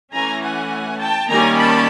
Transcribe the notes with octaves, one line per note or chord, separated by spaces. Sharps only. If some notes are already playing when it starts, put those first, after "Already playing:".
E3 A3 C#4 G#5 A#5
F#5 G#5
G5 A5
D#3 G3 A#3 C#4 G#5 A#5
A5 B5